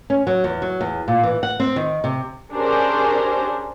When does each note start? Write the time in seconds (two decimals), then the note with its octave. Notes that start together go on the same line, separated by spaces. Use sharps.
0.10 C#4
0.27 F#3
0.44 E2
0.62 F#3
0.81 E2
1.08 A#2
1.23 E3
1.43 F#5
1.60 C4
1.76 D#3
2.04 C3
2.52 C#4 D4 G4 G#4 A#4 C5